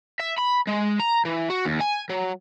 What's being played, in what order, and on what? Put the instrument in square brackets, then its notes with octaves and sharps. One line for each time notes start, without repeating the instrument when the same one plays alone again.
[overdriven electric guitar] E5
B5
G#3
A#5
E3
F#4
D#2
G#5
F#3